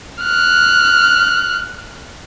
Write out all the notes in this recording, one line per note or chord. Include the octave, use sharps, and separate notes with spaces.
F6 F#6